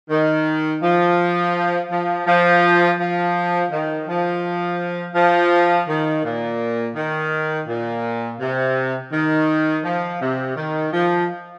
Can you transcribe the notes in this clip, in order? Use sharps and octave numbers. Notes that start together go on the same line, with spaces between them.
D#3
F3
F3
F3
F3
D#3
F3
F3
D#3
A#2
D#3
A#2
C3
D#3
F3
C3
D#3
F3